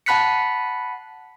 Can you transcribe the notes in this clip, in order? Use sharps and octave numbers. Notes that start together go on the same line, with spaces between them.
F#5 A5 B5 F#6 B6 C#7